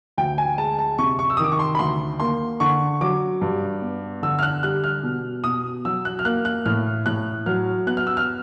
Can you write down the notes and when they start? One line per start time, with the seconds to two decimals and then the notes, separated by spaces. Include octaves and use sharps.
0.18 D2 G5
0.38 G#5
0.58 G#3 A5
0.79 A5
0.98 C3 C#6
1.19 C#6
1.30 E6
1.37 D#3 D#6
1.44 D6
1.52 C#6
1.59 C6
1.75 B5
1.79 D2 C6
2.20 A#3 C6
2.60 D3 C#6
3.01 F#3 D6
3.41 G2
3.82 B3
4.22 D3 E6
4.39 F6
4.43 F#6
4.63 G3 F#6
4.84 F6
5.03 B2
5.44 B2 D#6
5.85 F#3 E6
6.05 F#6
6.19 F6
6.25 A#3 F#6
6.45 F#6
6.66 A2 F6
7.06 A2 F#6
7.46 F#3 F6
7.87 B3 F#6
7.97 F6
8.07 E6
8.17 F6